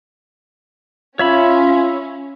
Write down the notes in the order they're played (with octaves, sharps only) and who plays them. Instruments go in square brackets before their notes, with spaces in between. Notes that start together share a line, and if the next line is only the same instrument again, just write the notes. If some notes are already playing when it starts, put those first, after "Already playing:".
[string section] C#4 [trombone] F4 [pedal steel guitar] C#5 E5 B5